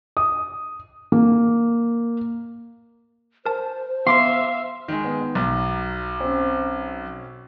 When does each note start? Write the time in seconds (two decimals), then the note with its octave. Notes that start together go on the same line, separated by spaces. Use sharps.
0.17 D#6
1.12 A#3
3.46 A#4 C5 A5
4.07 B3 E5 F5 C6 D6 B6
4.88 D#3 G#3
5.04 B3
5.35 B1 F#3
6.20 C4 C#4